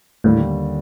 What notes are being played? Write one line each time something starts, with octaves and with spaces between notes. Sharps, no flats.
D#2 A2 D3 G3